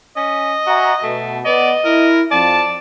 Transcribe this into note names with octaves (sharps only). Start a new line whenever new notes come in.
C#4 D#5
F#4 E5 G#5 A#5
B2 A3
B3 D5 D#5
E4 A#4
F2 D5 A5